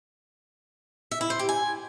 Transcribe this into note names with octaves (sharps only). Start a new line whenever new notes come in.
E5
E4
C5
G4
G#5